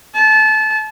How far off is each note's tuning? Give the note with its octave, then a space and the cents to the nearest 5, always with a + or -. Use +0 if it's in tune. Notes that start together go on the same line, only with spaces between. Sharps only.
A5 -25